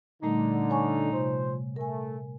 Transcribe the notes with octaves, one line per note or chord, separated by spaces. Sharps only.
A#2 D3 G3 A3 D#4
C#5 G#5 C#6
C3 F3 C5
A3 A#4 G#5